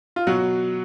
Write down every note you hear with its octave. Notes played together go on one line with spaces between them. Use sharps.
F4
B2 F#3 F#4